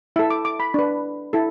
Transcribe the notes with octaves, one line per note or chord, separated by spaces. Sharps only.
E4 A4 E5
D6
D6
B5
D4 B4
E4 A4